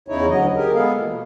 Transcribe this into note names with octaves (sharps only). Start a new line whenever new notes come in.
E2 C#3 D#4 E4 C#5
D2 F#3 D#5
G4 G#4 A#4
G#3 B3 G#4 A4 F5
A#2 E3 A#3
B2